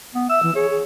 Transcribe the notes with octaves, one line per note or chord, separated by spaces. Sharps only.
B3
E5 E6
E3
G#4 C#5
G#4